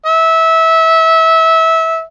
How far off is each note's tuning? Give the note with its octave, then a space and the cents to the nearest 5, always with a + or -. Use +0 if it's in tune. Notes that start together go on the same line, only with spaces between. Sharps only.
E5 -20